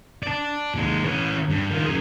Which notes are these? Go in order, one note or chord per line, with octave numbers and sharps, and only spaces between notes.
D5 A5
D#2 G#3
E3 C#4
G2
D#3 F4
F#2 G#4